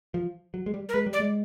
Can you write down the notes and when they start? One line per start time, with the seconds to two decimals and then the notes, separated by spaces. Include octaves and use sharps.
0.14 F3
0.54 F#3
0.66 G#3
0.74 G3
0.89 A#4
0.93 G#3 B4
1.06 G3
1.13 D5
1.20 G#3